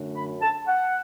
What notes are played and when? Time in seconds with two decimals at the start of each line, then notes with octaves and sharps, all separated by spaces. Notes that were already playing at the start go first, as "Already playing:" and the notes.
Already playing: F#2 D3 A3 D4
0.15 B5
0.42 A5
0.67 F#5